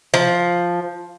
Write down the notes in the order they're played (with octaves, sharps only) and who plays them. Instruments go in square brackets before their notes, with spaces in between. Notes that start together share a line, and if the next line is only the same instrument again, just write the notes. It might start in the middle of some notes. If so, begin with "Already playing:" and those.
[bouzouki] F3